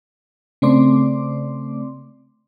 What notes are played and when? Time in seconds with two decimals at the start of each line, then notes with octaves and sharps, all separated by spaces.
0.62 C#3 A3 C4 D5 C6 D6